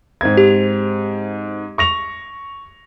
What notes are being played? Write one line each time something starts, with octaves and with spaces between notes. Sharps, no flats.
G#2 C4 G#6
G4
C#6 A#6 F7